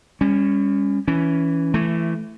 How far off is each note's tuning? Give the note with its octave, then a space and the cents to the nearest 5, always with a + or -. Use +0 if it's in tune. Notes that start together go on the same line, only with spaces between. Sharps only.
G3 +40 C#4 +0
E3 +0 C#4 +15
E3 +15 A3 -5